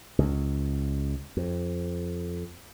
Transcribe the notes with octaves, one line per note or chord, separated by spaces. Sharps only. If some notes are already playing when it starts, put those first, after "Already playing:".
C#2
F2